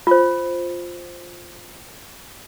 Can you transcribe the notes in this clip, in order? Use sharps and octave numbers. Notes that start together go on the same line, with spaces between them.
F4 C5